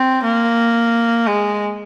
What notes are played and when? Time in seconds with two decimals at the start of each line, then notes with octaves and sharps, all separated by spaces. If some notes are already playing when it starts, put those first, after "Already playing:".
Already playing: C4
0.24 A#3
1.27 G#3